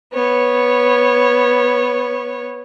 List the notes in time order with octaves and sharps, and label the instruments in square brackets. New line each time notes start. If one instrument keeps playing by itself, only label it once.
[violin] B3 C#5